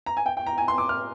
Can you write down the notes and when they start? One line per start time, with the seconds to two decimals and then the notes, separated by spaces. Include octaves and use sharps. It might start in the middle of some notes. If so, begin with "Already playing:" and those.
0.06 A#5
0.17 G#5
0.26 G5
0.37 G5
0.47 A#5
0.58 G#5
0.68 C6
0.78 D6
0.89 F6